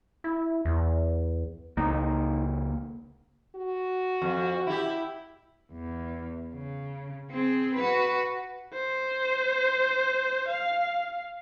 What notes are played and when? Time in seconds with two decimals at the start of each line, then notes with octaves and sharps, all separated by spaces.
0.24 E4
0.65 E2
1.77 C#2 A#3 D#4
3.55 F#4
4.22 F2
4.67 E4 G4
5.72 E2
6.55 C#3
7.30 C4 G#4
7.76 F#4 B4
8.74 C5
10.49 F5